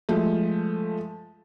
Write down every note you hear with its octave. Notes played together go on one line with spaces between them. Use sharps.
F3 G#3 A3